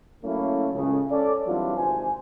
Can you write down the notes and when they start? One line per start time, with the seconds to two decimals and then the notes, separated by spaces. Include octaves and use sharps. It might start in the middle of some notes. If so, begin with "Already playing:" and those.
0.24 F#3 A3 A#3 C#4 E4
0.74 C#2 A2 C#3
1.11 C#4 A4 D5
1.47 E3 F#3 G3 C4 D4 F4
1.77 G#1 C3 C5 G#5